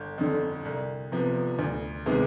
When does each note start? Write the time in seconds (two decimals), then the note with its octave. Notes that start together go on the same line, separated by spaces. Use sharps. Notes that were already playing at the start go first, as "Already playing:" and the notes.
Already playing: G1 G6
0.18 F2 D3
0.65 C2
1.12 C3 F3 B3
1.59 D2
2.06 C3 D#3 G#3 B3